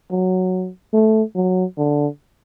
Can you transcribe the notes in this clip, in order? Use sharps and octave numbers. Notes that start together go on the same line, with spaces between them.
F#3
A3
F#3
D3